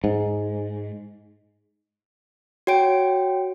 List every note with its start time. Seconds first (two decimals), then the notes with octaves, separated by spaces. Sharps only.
0.04 G#2
2.67 F#4 C#5 G5 D7